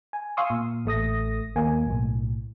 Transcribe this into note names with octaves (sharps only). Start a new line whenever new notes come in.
G#5
F5 G#5 C6 C#6 D#6 E6
A#2
A1 A3 D#6 A#6
D#2 A#3 G#5
B1 A2